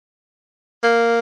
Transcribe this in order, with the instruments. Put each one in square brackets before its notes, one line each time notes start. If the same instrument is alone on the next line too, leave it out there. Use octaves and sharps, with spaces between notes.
[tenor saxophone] A#3